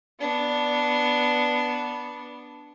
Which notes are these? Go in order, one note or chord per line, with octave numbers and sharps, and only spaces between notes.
B3 D4